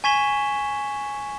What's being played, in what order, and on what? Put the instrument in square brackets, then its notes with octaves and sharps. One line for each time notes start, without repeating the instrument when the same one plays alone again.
[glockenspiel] G#5 C#6 G#6 B6 E7 G7